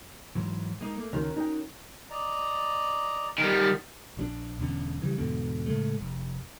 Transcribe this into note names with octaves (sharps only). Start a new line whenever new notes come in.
G#2 E3 F#3
G#3 A#3 D#4
A3 A#3
C#2 D#3 C#4 F#4 A#4
D#4 G5
D5 D#5 A#5
D#3 G3
A#1 F3 D4
E1 E2 D3 C#4
C#3 E3 F#3 G3
E2 G#2 B2 D3
A2 C#3 G#3 A3
F1